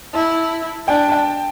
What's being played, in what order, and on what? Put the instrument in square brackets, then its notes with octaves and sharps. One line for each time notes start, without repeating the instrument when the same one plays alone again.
[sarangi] E4 [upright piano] A5
[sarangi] D4 [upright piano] G5
[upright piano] A5
G5